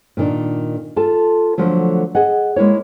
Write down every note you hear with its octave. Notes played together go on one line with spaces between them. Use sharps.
A#2 D#3 D4
F4 A4 A5
D3 F3 F#3 A3
G#4 D#5 F#5
G#3 A#3 E4 C#5